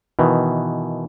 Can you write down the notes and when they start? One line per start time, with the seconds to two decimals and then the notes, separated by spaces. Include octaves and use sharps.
0.19 B2 D#3 E3